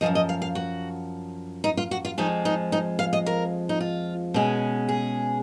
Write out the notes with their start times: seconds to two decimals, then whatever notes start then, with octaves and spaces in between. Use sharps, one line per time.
0.01 C#3 F3 D#5
0.06 F#2
0.15 D#5
0.29 F5
0.42 F5
0.55 F#4
1.64 D#4
1.77 F4
1.91 F#4
2.05 F4
2.18 F2 F3 G#3 D#4
2.45 D#4
2.72 D#4
2.99 F5
3.13 D#5
3.26 A#4
3.69 D#4
3.81 F4
4.34 B2 G#3 C#4
4.89 G#4